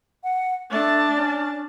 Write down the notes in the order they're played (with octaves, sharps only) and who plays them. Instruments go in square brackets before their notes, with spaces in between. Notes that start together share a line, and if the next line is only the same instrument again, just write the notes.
[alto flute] F#5
[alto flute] A3 [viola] D4 A5
[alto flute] C#4